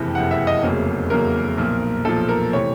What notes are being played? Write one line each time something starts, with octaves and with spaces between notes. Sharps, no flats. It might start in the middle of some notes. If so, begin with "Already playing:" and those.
Already playing: F#1 F2 C3 E3 G5
F#1 F2 C3 E3 F#5
E5
D#5
F1 E2 C#3 F#3 A#3
F1 E2 C#3 F#3 A#3 A#4
B1 A#2 F3
B1 A#2 F3 A4
A#4
C3 E3 A3 C#5